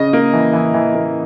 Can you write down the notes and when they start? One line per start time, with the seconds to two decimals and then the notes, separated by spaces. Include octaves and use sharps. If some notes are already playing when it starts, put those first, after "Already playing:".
Already playing: C#3 D#5
0.13 A#3
0.33 E3
0.53 E3
0.74 E3
0.95 A#3